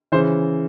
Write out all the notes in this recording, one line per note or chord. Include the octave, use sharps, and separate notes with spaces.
C#3 E3 C5